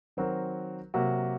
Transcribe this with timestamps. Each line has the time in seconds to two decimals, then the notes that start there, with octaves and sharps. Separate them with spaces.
0.17 D#3 F#3 C4 F#4 A#4
0.94 C3 F#3 A#3 F#4